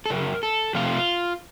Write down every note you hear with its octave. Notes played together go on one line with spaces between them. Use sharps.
A4
F#2 C#3 F#3 A#4
A4
F2 C3 F3 A3 F4